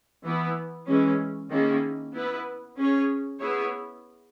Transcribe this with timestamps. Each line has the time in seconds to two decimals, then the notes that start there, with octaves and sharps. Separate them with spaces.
0.24 E3 B3 E4
0.87 E3 G#3 C#4
1.51 D#3 A#3 C#4 E4 G#4
2.13 B3 E4 B4
2.77 C#4 G#4 C#5
3.40 B3 E4 G#4 C#5